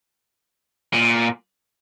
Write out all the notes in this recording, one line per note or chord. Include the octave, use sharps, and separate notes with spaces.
A#2